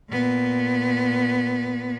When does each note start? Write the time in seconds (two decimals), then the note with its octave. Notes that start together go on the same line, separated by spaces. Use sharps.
0.10 A#2 B3